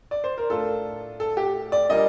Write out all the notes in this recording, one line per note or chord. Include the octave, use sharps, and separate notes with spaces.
D5
C5
A#4
A2 A3 D4 F4 A4
A4
G4
D5
A#2 G3 A#3 D4 D#5